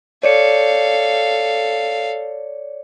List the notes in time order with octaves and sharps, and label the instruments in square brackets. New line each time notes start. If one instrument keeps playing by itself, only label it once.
[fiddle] A4 F5 [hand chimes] C#5 D5 C#7